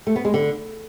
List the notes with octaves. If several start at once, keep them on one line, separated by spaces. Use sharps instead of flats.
A3
B3
G#3
D3